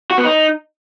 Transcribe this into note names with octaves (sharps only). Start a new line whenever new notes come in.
F#4
B3
D#4